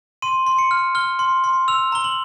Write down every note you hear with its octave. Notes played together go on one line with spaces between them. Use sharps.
C6 D#7
C6
C#7
F6
F6 G7
C6
C6
E6 F7
A#5 G7
F#7